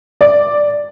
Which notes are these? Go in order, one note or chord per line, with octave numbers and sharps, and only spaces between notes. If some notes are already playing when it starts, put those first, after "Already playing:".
D5